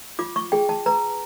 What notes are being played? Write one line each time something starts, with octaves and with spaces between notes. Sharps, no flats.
F4 D6
C#6
G#4 G5
A5
B4 A#5